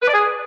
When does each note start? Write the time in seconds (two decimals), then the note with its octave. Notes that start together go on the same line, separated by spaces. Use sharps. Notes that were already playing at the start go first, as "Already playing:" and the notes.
0.02 B4
0.08 D5
0.13 G#4